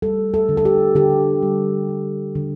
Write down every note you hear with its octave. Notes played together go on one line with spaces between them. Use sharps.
G3 A4
A4
D3
A4
G4
D3 G4
G3
G3
D3